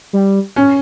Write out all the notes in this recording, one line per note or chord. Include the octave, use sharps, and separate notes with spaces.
G3
C#4